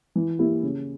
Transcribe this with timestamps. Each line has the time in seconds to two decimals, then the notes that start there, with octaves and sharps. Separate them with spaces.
0.16 E3
0.39 A#3 E4 G4
0.63 C#3